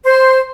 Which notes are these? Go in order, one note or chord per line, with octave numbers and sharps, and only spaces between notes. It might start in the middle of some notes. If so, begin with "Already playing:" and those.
C5